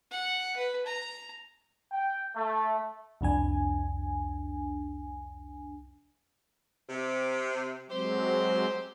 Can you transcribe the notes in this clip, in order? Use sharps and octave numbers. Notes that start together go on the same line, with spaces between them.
F#5
B4
A#5
G5
A3
C2 F2 D4 G#5
C3
F#3 G#3 C4 G4 C5